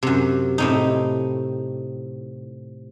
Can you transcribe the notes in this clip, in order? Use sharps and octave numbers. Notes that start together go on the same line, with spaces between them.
F#2 C3
A2 C3 D#4